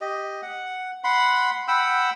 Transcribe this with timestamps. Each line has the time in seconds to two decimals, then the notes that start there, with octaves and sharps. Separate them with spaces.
0.01 G4 D#5
0.42 F#5
1.04 F#5 B5 C6
1.68 F#5 G5 B5 E6